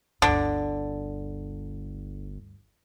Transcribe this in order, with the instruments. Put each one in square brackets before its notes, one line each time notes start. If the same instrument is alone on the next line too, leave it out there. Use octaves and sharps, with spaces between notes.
[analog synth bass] G1 [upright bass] D2 G2 [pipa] D3